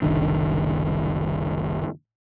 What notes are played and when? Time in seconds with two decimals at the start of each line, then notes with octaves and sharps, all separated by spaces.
0.02 F#1 C2 D#3 D4